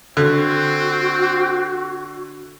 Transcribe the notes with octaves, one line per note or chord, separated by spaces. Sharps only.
D3 C4 F#4